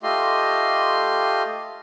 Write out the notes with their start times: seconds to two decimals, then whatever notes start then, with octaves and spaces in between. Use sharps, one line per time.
0.03 A3 F4 G4 D#5 C6